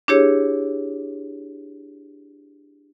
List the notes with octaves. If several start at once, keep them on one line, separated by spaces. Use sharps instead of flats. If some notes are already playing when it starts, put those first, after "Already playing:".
D4 E4 G4 G#4 C#5